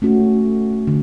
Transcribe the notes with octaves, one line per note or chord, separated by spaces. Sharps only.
A3 C#4 F#4
D3